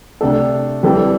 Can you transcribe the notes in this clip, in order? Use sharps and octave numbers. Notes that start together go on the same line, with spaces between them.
C3 A3 D4 A4
E3 G3 C4 A4